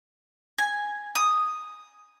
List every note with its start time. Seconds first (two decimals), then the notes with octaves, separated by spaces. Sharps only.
0.58 G#5
1.15 D#6